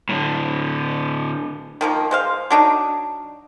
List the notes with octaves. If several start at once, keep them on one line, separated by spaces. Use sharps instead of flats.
A2 D3
D#3 F3 A#3
G#3 C5 F5
F#3 D4 D#4